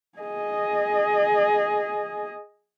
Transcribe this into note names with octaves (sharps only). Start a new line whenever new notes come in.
G#4 D#5